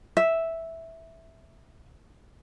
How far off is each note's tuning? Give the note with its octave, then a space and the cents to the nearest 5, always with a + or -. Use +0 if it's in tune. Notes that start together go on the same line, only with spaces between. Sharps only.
E5 -5